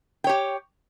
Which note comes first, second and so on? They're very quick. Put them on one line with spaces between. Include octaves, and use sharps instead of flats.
G5 C#5 G4